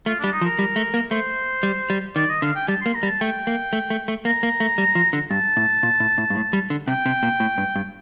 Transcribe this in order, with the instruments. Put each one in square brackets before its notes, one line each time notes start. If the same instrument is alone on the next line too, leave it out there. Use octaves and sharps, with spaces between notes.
[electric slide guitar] A3 [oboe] F4
[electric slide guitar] G3 [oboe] D4
[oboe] D#4
[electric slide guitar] F3
[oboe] A#4
[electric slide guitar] G3
A3
A#3
[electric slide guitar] A3 [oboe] C5
[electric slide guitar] G3
G3
[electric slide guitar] D#3 [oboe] D5
[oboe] D#5
[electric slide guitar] D3 [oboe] F5
[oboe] G5
[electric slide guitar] G3 [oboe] A5
[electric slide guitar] A#3 [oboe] C6
[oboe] A#5
[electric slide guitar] G3
[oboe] A5
[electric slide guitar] A3 [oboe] G5
[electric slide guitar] A#3
A3
A3
A3
[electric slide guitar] A#3 [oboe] A#5
[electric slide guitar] A#3
A3
G3
F3
D3
[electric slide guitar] G2 [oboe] A5
[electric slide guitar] A2
A#2
A2
A2
G2
A2
G3
D3
[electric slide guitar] C3 [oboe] G5
[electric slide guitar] C3
A#2
A2
G2
G2